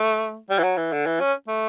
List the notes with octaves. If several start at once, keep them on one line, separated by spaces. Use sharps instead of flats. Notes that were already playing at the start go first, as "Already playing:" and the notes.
Already playing: A3
G3
E3
F#3
E3
D3
E3
C#4
A3